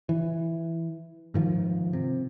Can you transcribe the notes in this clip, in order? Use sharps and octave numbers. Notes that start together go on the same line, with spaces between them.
E3
G#2 D#3 F3
C3